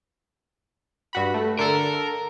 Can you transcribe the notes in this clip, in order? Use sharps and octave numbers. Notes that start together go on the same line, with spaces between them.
G2 F#4 B5
A3
D3 A4 A#4